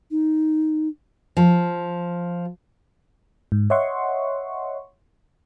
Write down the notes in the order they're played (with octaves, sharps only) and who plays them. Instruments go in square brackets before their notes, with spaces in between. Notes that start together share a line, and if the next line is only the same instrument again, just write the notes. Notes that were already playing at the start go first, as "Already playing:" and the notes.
[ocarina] D#4
[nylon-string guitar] F3
[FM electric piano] G#2
C#5 D#5 E5 F#5 C6 C#6